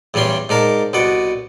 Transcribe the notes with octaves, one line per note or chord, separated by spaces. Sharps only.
E2 G2 G3 C#4 C6
G#2 D4 A#4 A5
C2 B2 D5 F#5